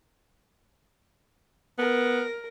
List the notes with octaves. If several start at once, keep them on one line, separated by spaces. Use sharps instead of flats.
B3 A#4